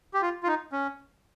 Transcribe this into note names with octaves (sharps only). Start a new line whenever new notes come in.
G4
F4
F4
D#4
C#4